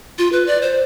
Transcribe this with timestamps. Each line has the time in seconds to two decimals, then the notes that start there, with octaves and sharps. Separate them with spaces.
0.18 F4
0.32 B4
0.47 D5
0.62 C5